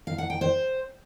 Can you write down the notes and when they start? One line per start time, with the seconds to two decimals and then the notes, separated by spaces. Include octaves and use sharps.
0.07 F5
0.18 F#5
0.30 G5
0.41 C5